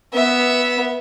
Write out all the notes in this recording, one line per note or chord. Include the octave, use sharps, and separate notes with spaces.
B3 E5